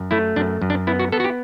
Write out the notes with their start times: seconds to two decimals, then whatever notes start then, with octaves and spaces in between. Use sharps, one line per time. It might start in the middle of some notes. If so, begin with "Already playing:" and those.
Already playing: F#2
0.11 A3 E4
0.36 F#2 D4
0.62 F#2
0.70 D4
0.87 B3 E4
0.99 F#4
1.12 B3 A4
1.20 F#4
1.24 G4